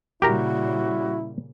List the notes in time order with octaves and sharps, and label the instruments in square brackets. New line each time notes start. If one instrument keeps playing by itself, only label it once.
[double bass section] A#2 C#3 G3 [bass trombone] E4 [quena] F#4 [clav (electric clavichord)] G4 A#4 A#5